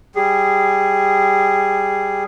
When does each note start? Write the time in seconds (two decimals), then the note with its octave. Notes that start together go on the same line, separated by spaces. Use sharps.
0.15 G3 G#4